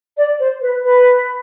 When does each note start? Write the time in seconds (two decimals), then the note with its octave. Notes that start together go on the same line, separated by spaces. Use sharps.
0.17 D5
0.38 C5
0.61 B4
0.83 B4